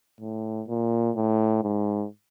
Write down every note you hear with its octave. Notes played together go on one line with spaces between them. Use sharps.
A2
A#2
A2
G#2